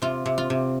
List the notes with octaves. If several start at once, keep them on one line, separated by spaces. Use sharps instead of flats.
C3 F4
C3
F4
C3